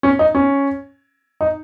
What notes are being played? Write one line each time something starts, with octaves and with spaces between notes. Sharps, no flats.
C#4
D#4
C#4
D#4